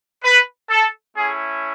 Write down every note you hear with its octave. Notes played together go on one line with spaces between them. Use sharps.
B4
A4
A3 C#4 E4 G#4